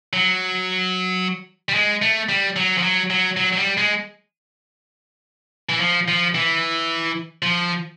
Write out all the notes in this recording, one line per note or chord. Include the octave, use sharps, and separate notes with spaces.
F#3
G3
G#3
A3
G3
F#3
F3
F#3
F#3
F#3
F#3
G3
G#3
E3
F3
F3
E3
F3